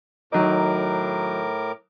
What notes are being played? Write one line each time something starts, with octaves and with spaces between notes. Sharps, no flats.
A2 D#3 F#3 D#4 A#4 D6